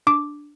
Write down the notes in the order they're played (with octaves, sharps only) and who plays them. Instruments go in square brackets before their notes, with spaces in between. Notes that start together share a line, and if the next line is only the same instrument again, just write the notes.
[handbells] D4 D6